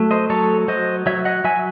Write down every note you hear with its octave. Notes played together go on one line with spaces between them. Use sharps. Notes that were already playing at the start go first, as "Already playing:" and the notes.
Already playing: F#3 A3
C5 D#5
F#3 A4 C#5
F#3 C5 D#5
F#3 C#5 E5
D#5 F#5
F#3 E5 G#5